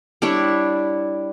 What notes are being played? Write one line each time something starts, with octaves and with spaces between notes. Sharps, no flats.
G3 D4 E4 C#5